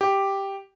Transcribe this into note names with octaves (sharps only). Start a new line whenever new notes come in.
G4